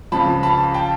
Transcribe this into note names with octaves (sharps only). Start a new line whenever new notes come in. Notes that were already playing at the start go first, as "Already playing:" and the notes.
C#2 C#3 F3 A5 B5
A5 B5
G5 A5